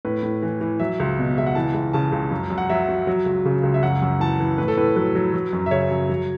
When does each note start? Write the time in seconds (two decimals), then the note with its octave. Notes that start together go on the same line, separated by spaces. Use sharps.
0.05 A2 B4
0.23 A2
0.42 E3
0.61 E3
0.79 F#3 E5
1.00 C#2
1.19 B2
1.37 C#2 E5
1.46 F#5
1.55 E3 A5
1.74 C#2
1.93 C#3 A5
2.12 C#2
2.31 F#2
2.50 F#2
2.58 F#5
2.70 F#3 E5
2.89 F#3
3.07 F#3
3.26 C#2
3.45 C#3
3.63 C#2
3.74 E5
3.82 F#2 F#5
4.02 F#2
4.20 E3 A5
4.40 E3
4.58 A2 B4
4.68 A4
4.77 A2 B4
4.96 F#3 B4
5.15 F#3
5.34 F#3
5.53 F#2
5.66 E5
5.71 C#3 C#5
5.91 F#2
6.09 F#3